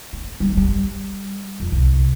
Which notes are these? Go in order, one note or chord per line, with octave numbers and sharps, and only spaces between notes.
A3
G3
G3
F2
C2